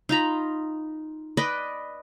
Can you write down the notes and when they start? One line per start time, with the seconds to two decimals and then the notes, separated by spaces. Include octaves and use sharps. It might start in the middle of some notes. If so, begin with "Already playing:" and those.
0.09 D#4 F4 A#5 B5
1.37 B4 D5 D#5